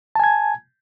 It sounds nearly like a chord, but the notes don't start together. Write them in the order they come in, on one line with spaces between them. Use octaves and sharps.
A5 G#5 G#6